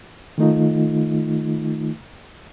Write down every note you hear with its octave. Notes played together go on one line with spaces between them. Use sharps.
D#3 A3 D#4 F4